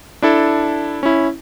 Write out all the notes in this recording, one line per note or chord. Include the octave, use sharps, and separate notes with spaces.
D4 E4 A4
C#4 E4